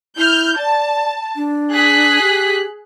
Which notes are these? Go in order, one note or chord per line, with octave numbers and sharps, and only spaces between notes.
E4 F6 G6
D5 A5
D4
G#4 F#6 B6
G4